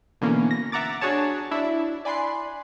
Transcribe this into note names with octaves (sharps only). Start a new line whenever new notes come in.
B2 D3 E3 A#3 C#4
A#6
E5 F#5 A#5 D6 A6
D4 F#4 G#4 C#5 A5
D4 E4 E5
D5 G#5 B5 C6 F#6 C7